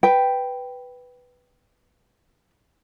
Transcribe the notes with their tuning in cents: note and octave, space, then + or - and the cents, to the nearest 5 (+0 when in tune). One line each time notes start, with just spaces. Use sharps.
B4 +0 G5 +0